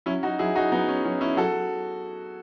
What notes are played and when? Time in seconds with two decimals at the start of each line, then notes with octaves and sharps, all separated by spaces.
0.06 F#3 C#4 E4
0.23 D#4 F#4
0.39 F#3 E4 G#4
0.55 D#4 F#4
0.72 F#3 B3 D#4
0.88 C#4
1.05 F#3 C#4
1.21 C#4 E4
1.33 G#4
1.37 F#3 F#4 A4